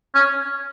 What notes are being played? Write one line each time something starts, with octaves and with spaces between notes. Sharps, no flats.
C#4